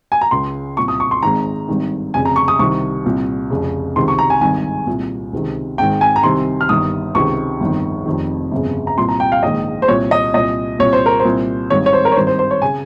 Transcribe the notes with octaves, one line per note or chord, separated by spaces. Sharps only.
G#5
A#5
C#2 C#3 C6
C2 A#2 C#6
D#6
C#6
C6
G#1 G#2 D#3 A#5
G#1 G2 D#3
F1 F2 C#3 G#5
A#5
C#6
D#6
C2 C3 D#3 C#6
C2 A#2
F1 F2 C#3
C#2 C3 D#3 C6
C#6
A#5
G#5
G#1 G2 D#3 G#5
C2 A#2
C#2 C3 D#3
G#1 G#2 D#3 G5
G#5
A#5
C2 C3 D#3 C6
F6
G1 G2 D#3 D#6
C#2 C3 D#3 C#6
G1 F2 D#3
F1 F2 C3 D#3
G1 F2 C#3
A#5
C2 A#2 C6
A#5
G5
F5
A#1 G#2 D#3 D#5
C5
C2 A#2 C#5
D#5
C2 A#2 D#5
C2 A#2 C#5
C5
A#4
C5
C2 A#2
G#1 G2 D#3 C#5
C#5
C5
A#4
C#5
G#1 G2 D#3 C5
C5
C5
C#5
C#3 G#5